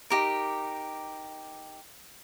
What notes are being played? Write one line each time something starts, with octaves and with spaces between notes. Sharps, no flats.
D#4 G4 A#4